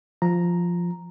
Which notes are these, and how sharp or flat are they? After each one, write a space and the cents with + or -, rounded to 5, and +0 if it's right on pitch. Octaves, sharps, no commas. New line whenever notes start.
F3 +0 A#5 +0